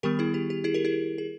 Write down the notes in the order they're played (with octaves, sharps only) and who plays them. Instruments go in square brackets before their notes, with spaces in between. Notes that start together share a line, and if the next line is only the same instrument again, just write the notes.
[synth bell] D#3 G3 B3 G4 A#4
E4 G#4
G4
G4
E4 G#4
G4 A#4
E4 G#4
G#4